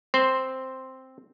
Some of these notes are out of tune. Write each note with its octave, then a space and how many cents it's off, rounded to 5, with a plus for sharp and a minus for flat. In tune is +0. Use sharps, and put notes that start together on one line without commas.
C4 +0 C5 +0